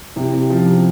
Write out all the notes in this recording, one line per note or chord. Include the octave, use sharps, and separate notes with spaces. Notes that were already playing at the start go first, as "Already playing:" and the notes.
C3 E4
C3
F3
C3